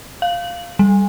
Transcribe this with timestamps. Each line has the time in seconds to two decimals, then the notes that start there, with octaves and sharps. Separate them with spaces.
0.22 F5
0.79 G3